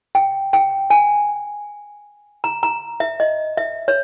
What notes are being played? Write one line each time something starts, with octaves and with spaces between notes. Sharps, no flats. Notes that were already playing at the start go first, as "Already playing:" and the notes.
G5
G5
G#5
A#5
A#5
E5
D#5
E5
C#5